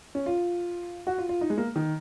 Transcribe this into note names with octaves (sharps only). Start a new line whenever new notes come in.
C#4
F4
F#4
F4
F4
D#4
G#3
A#3
D#3